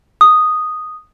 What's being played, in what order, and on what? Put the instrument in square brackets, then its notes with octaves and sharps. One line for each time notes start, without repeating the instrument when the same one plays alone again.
[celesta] D#6